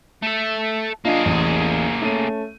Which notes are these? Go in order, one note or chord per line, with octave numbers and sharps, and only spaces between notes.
A3 A4
A#3 D4 F4 G#4 D#5
A1 E2
A3 C#4 D#7